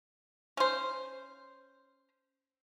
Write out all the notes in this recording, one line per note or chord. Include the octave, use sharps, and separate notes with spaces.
C#4 C5